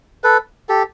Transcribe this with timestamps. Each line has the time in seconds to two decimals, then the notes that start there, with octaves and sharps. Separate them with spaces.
0.24 A4 B4
0.69 G4 A4